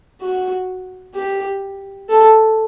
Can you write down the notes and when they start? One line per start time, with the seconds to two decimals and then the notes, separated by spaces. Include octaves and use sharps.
0.22 F#4
1.14 G4
2.09 A4